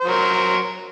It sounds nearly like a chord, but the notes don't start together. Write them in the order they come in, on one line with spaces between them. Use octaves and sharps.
C5 F#3 A#4